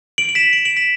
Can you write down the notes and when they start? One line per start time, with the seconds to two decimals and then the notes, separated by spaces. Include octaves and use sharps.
0.18 D7 F#7
0.29 F#7
0.35 B6 E7
0.53 D7 F#7
0.65 D7 F#7
0.77 B6 E7